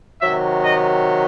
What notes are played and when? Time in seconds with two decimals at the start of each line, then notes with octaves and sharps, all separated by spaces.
0.20 C3 D#3 F#3 E5
0.63 D#5